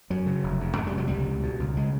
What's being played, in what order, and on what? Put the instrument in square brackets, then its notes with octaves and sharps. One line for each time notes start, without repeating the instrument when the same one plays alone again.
[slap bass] F#2 F#3
C#3
F1
F2
F2 G#3
G3
C3 F#3
C#2 G3
C#2
B2
C#2
C#3 G#3